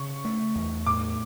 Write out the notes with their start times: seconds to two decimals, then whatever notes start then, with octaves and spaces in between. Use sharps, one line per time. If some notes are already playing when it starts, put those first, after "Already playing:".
Already playing: C#3 C#6
0.25 A3
0.55 E2
0.86 A2 D6